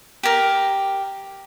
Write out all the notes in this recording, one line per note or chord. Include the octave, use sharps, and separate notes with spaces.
G4 A#4